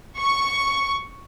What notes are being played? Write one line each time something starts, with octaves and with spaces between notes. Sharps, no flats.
C#6